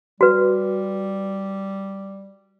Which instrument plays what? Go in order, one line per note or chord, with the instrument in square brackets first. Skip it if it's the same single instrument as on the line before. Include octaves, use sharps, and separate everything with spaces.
[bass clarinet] G3 [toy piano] F#4 B4